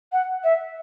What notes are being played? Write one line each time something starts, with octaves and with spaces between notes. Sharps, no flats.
F#5
E5